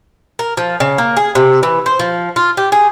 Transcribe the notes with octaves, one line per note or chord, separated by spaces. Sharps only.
A#4
F3
C#3
A#3
G#4
C3
E3
C5
F3
F4
G4
G#4